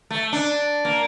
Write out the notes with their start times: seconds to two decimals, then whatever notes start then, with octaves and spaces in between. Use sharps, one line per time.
0.11 A3
0.33 D4
0.85 A#3